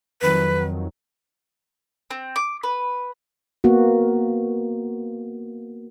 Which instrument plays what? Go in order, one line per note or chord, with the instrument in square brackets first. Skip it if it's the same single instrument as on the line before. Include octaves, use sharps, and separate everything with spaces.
[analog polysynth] F2 D#3 F#3 [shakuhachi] B4
[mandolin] C4
D6
B4
[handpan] A#3 B3 F#4